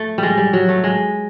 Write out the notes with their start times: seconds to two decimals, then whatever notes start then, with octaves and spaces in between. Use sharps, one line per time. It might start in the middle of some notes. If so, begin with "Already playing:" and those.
Already playing: A3
0.18 G3
0.23 G#3
0.37 G3
0.53 F#3
0.69 A3
0.84 G#3